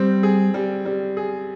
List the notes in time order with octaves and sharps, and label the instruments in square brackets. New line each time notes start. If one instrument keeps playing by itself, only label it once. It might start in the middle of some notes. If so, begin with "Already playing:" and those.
Already playing: [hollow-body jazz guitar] G3 [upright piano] C4
[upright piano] G#4
G3
G3
G#4